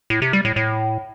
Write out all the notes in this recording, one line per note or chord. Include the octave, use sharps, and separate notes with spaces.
A2
C3
G3
A2
A2